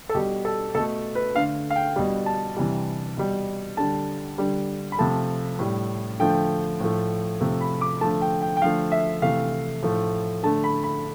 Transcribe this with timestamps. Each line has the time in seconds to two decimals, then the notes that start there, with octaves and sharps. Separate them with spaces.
0.09 A4
0.14 B2 G3 G4
0.45 A4
0.75 B2 A3 A4
1.15 B4
1.35 D3 A3 F5
1.70 F5
1.76 G5
1.96 B2 G3
2.26 A5
2.56 C3 E3 G3
3.17 B2 G3
3.77 D3 G3 A5
4.38 D3 G3
4.92 B5
4.98 C3 F3 A3 A5
5.59 A2 G3
6.20 D3 F3 A3 G5
6.80 A2 F3 A3
7.41 C3 F3 A3
7.61 B5
7.81 D6
8.01 D3 F3 A3 A5
8.22 G5
8.42 G5
8.57 G5
8.62 D3 F3 A3 F5
8.92 E5
9.22 C3 E3 A3 F5
9.83 A2 F3 A3
10.43 D3 A3 A5
10.64 B5
10.84 B5